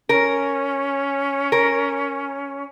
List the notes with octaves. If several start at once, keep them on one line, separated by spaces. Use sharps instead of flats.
C#4 A#4
A#4